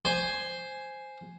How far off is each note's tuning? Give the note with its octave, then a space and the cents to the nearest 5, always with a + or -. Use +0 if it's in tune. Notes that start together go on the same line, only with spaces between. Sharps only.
C5 +0 G#5 +0